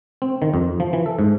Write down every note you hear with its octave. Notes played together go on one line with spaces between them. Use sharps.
C4
D#3
F2
F3
E3
A4
G#2